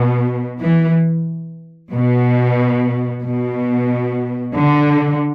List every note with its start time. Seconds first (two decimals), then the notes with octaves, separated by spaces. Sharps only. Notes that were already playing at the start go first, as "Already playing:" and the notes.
Already playing: B2
0.59 E3
1.91 B2
3.23 B2
4.54 D3